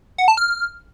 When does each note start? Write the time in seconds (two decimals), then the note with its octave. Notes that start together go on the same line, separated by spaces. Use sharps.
0.18 F#5
0.28 A5
0.37 F6